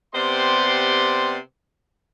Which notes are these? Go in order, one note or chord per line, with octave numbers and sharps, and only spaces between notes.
C3 B3 G4 C5 D5 C6